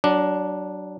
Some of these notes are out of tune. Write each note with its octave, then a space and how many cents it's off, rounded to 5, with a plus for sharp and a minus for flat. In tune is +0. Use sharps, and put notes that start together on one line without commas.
F#3 +25 D4 +0